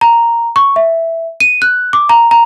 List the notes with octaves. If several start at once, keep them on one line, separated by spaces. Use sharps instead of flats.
A#5
C#6
E5
D#7
F#6
D6
A#5
A#5